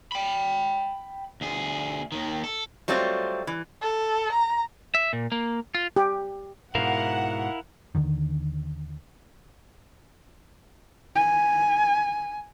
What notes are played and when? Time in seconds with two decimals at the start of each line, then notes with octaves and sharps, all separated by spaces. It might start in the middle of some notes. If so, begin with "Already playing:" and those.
0.12 G5 B5
1.41 D2 G#4
2.12 D#2 D#3
2.44 A4
2.88 F#3 G3 A3 C4 F4
3.47 E3
3.81 A4
4.32 A#5
4.95 E5
5.13 A#2
5.32 A#3
5.75 F4
5.96 G4
6.75 G#2 B2 E4 A#4 F5 F#5
7.95 D#2 B2 D3 D#3
11.15 G#5